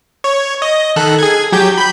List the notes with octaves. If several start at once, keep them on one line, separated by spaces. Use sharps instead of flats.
C#5
D#5
D#3 A4 F#6
G#4 G#6
F#3 G4 G6
B5 G6